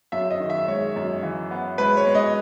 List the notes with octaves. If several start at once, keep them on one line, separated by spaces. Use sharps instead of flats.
F#2 E5
D#5
D#3
E5
G#3 C#5
F#2
E3
B3
G#3 B4
C#5
G#3
D#5